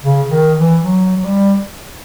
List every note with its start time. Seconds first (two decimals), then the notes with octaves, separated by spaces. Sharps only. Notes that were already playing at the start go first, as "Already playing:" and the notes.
0.04 C#3
0.31 D#3
0.57 E3
0.84 F#3
1.17 F#3
1.24 G3